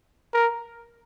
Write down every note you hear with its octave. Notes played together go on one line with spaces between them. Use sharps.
A#4